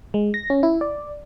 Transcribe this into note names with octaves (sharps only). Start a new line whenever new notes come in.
G#3
A#6
C#4
E4
D5